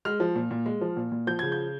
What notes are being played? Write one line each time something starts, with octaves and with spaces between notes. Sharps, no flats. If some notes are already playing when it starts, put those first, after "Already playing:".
G#3 F6
F3
A#2
A#2
G#3
F3
A#2
A#2
F3 G6
C#3 G#6
G6